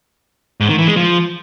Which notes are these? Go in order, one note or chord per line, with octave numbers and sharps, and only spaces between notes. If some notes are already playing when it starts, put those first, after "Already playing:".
G#2
D#3
E3
G#3
F3